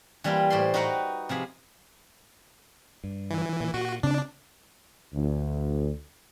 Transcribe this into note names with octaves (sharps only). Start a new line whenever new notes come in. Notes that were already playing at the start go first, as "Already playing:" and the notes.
E3 G3 A#3 E4 F4
A2 C5 D5 G5 B5 C6
D#4 F#4 B4 F#5 G5 A#5
C3 F3 G#4 B5
G2
E3
A#2
A#2 F#4
C#3 C4 D4
D2